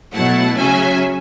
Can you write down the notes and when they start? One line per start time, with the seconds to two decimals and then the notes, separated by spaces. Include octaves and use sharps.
0.13 B2 F#3 A3 E4 F#5 A5
0.57 C#3 F#3 C#4 E5 G#5